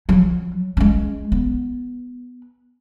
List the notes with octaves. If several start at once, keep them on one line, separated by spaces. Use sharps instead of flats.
F3 F#3
G#3 C#4
B3